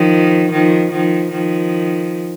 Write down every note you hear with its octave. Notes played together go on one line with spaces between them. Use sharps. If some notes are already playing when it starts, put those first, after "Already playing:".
Already playing: D#3 F3
D#3 F3
D#3 F3
D#3 F3